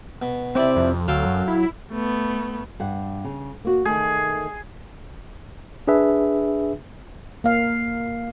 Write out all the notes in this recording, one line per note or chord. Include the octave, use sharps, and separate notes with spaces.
B2
C3 C4 E4 C5 D5 D6
F2
D2 F#3 A4 F5 G5
F#2
E4
A3 B3
G2 F#5
C#3
A#3 F#4
D#3 A3 G#4
D4 G#4 B4 E5
A#3 F5